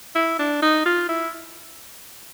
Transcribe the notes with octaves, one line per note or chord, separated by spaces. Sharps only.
E4
D4
D#4
F4
E4